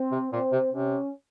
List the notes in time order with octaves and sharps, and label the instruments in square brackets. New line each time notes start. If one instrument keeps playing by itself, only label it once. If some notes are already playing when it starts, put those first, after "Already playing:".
Already playing: [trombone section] C4
[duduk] C3
[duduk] A#2 [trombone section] C4
[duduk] C3
[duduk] C3 [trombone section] C#4